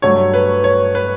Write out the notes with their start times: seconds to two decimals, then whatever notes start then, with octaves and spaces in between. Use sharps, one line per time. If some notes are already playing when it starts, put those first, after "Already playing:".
0.02 G2 F#3 A3 C#5
0.34 B4
0.64 C#5
0.95 B4